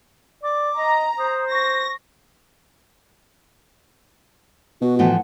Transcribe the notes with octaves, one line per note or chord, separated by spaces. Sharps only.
D5 D6
D#5 A#5
C5 D#6
C#6 A#6
B2 F#4
A2 E3 F3 F#5